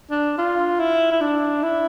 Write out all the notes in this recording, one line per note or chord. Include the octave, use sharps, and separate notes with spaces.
D4
F4
E4
E4
D4
E4